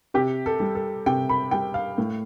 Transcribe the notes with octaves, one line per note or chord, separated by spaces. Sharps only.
C3 G4
A4
G3
A4
C3 G5
B5
G3 G5
F5
A2